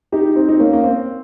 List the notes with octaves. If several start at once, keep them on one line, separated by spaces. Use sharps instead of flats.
D#4 G4
C4 D#4
D#4
A#3 C#4
A#3
C4